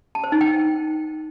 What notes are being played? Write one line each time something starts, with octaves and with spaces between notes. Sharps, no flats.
A5
C5
D#4
G5